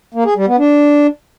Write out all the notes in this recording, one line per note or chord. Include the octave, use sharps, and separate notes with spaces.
A#3
G#4
G3
B3
D4